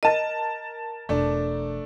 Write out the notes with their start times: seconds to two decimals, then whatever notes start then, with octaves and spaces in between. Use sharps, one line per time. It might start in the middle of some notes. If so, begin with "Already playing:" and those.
0.03 A#4 D#5 A5 A6
1.09 E1 A3 D4